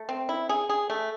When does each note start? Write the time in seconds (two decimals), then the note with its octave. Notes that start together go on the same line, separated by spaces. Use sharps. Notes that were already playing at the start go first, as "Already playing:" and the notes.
Already playing: A3
0.09 C4
0.29 E4
0.49 G#4
0.69 G#4
0.90 A3